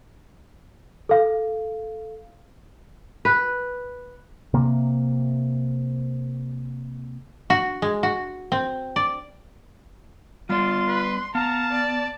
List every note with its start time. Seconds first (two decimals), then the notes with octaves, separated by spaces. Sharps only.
1.09 A4 F5
3.25 B4
4.54 C3 A#3
7.50 F#4
7.82 G#3
8.03 F#4
8.52 C4
8.96 D5
10.49 G3 B3 F4 D5 C6
10.87 B4
11.35 B3 F5 A5 A#5
11.72 D5